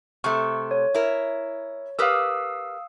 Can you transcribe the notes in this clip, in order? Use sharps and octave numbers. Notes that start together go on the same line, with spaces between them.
C3 A3 C#6
C#5
E4 A#4
G4 A#4 B4 F5 D#6 E6